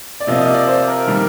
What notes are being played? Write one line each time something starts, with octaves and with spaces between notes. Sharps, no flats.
D5
C3 F3 A#3 F4 D#5
D#5
D5
C5
A#4
D#3 G3 A#3 A#4